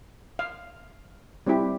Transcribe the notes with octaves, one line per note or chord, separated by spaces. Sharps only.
F5
G3 C4 E4 G4